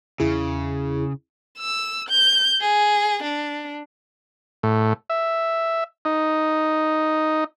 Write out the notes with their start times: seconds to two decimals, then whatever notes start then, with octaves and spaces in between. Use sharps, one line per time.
0.20 E2 C#3 E4 G#4
1.59 E6
2.09 G6
2.61 G#4
3.23 D4
4.63 A2
5.10 E5
6.05 D#4